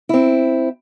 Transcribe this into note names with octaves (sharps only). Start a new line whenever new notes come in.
C4 E4